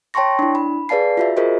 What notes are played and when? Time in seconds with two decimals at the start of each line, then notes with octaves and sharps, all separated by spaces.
0.14 C#5 G5 A5 C6 C#6 A#6
0.39 D4 E4
0.55 B5
0.89 G#4 B4 D5 F5 A5 C7
1.17 F4 F#4 E5
1.37 F4 F#4 G#4 A#4 C5 D#5